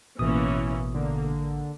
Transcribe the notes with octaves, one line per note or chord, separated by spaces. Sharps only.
A1 B2 E3 A#3 C#4 D#6
D3 A#3